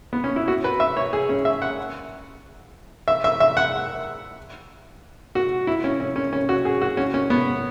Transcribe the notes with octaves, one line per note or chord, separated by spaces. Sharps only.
B3
C#4
E4
F#4
B4
E5
C#5
G#4
C#4
E5
F#5
E5
E5
E5
F#5
F#4
E4
C#4
C#4
C#4
C#4
F#4
G#4
F#4
C#4
C#4
B3